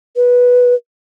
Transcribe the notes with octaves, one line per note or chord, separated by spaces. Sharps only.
B4